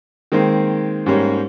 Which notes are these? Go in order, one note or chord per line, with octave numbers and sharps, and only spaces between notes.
D#3 G#3 A#3 C4 D#4
G#2 G3 A#3 C#4